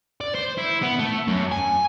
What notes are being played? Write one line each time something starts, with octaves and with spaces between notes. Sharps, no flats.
D5
C5
E4
B3
A3
F#2
G#5